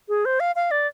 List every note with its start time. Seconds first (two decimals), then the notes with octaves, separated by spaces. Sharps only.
0.09 G#4
0.25 C5
0.40 F5
0.56 F5
0.71 D5